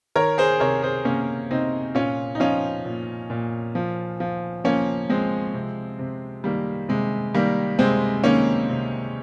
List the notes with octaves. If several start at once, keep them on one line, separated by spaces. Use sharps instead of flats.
D#3 A#4 C#5
G#4 C5
C3 A#4 C#5
G#4 C5
C3 A#3 C#4
C3 C4 D#4
A#2 C#4 F4
D#4
F3 C#4 F4
A#2
A#2
F3
F3
F3 A#3 C#4
F3 G#3 C4
C3
C3
D#3 G3 A#3
C3 G#3
D#3 G3 A#3
C3 G#3 C4
D#3 A#3 C#4
C3